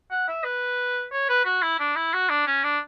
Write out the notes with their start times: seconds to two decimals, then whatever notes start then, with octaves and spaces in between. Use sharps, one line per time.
0.11 F#5
0.28 E5
0.44 B4
1.12 C#5
1.29 B4
1.45 F#4
1.62 E4
1.79 D4
1.96 E4
2.14 F#4
2.30 D4
2.47 C#4
2.64 D4